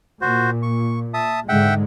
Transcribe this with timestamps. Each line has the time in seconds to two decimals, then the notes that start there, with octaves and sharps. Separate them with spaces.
0.21 A#2 F#4 C5
0.63 C#6
1.14 E5 A5 D#6
1.49 G#2 D3 G#3 E5 F#5 G5